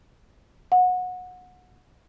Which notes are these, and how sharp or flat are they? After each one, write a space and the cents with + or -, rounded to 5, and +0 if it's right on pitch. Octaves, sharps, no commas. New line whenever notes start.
F#5 -25